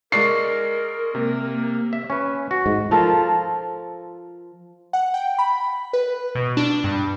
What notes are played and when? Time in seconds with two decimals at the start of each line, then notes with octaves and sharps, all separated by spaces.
0.12 G#3 A#4 D5 C#6 C7
1.15 C3 A#3
1.93 E5
2.10 C#4 B4
2.51 F#4
2.66 G#2
2.91 F3 F4 A4 A#4
4.93 F#5
5.14 G5
5.39 B5
5.93 B4
6.35 B2
6.57 D4
6.84 G2